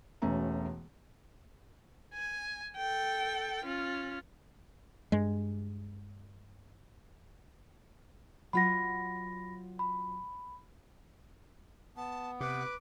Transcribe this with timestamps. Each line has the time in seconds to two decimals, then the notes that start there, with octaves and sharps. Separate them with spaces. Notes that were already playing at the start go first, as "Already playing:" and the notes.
0.22 E1 B2 A3 C#4 A#5
2.14 G#5
2.77 A4 G5
3.64 C#4 F4
5.12 G2 G#3
8.53 F#3 F4 F#5 B5 A#6
9.79 B5
11.96 B3 A5
12.40 C3 B4 D6